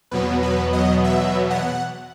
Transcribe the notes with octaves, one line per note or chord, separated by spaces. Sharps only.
E2 B2 F#3 B3 B4
B4
D#5
E5
F#5